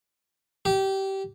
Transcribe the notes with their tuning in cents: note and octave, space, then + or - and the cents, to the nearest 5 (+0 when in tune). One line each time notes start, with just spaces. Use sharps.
G4 -20